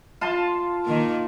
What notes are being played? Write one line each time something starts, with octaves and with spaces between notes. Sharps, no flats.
F4 A5 C6
D#3 A#3